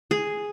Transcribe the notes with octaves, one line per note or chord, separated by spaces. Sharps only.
G#4